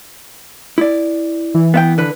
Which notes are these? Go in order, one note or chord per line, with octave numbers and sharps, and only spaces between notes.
E4 D5
E3
B3 E5 G5
D3 B4